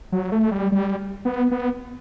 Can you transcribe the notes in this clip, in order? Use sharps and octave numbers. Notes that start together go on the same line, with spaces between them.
F#3
A3
G3
G3
B3
B3